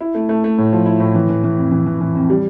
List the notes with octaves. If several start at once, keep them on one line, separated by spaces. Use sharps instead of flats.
E4
A3
A3
A3
A2
F3
E4
A2
E3
E3
E3
F2
E3
E3
E3
F2
G3